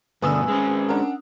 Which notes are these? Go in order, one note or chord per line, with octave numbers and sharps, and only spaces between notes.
G2 B2 D3 B4 G#5 D#6 E6
G#3 C4 C#4
D4 A#4 F#5